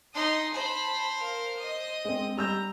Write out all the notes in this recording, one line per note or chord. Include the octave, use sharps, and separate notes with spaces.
D#4 C6 D#6
C5 A5 B5
A#4 F5
D#5 D#6
G#3 C4
G3 A#5 E6 G6